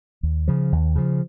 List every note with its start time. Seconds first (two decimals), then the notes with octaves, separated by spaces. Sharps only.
0.23 D#2
0.48 C#3 F3
0.72 D#2
0.96 C#3 F3